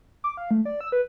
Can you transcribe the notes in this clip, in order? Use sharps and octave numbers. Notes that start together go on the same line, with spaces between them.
D6
F5
A3
D5
E6
B4